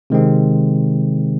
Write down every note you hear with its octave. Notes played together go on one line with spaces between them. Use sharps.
C3 D#3 G#3 C4